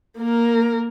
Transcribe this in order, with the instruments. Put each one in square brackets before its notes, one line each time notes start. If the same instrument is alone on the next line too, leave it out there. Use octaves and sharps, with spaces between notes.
[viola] A#3 A#4